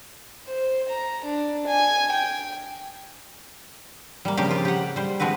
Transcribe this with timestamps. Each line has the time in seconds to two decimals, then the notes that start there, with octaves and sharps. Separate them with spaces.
0.47 C5
0.89 A#5
1.24 D4
1.67 G#5
2.12 G5
4.25 G3 A#3
4.37 C#3 F3 A#3 C4 G4
4.51 F4
4.65 G4 F#5
4.96 G3 C5
5.20 F3 G#3 C4 F#4 B4